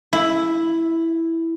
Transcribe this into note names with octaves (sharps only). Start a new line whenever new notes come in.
E4